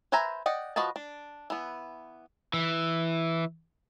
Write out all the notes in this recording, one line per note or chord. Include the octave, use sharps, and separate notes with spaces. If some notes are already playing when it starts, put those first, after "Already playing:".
B4 C5 E5 G#5 A#5
D5 D#5 F#5 G5
F3 F#4 B4 D#5 A5
D4
E3 B3
E3